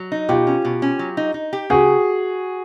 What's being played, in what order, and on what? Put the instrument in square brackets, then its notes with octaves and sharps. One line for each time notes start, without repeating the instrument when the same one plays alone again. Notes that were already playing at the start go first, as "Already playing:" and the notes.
Already playing: [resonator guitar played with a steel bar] F#3
D#4
[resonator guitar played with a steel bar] B2 [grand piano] F4 G4
[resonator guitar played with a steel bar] C#4
B2
C#4
F#3
D#4
D#4
G4
[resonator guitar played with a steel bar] C#3 [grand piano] F#4 G#4